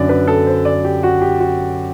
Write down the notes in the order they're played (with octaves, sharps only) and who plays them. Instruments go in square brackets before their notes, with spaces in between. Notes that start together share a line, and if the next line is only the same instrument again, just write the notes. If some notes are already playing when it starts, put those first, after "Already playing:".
Already playing: [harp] F#2 D3 F#3 B3 D4 [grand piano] D5
[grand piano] B4
A4
C5
D5
G4
F#4
G4
F#4